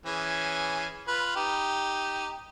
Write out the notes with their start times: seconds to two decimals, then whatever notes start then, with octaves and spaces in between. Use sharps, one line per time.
0.06 E3 C#4 G#4
1.08 F4 B4
1.36 D#4 G4